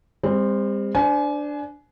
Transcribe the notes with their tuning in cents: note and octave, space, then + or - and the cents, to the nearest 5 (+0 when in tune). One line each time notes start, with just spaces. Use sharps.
G3 +45 C4 +0
D4 +0 C5 -25 G#5 +30